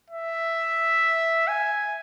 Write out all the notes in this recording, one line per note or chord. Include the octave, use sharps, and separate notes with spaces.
E5
G#5